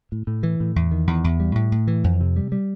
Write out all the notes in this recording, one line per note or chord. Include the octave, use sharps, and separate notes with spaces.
A2
A2
E3
A2
E2
D#3
E2
E2
G3
A2
A2
E3
F2
C3
G3
G3